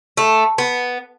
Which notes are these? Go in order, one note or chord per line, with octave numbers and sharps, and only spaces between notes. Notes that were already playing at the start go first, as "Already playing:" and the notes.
A3
B3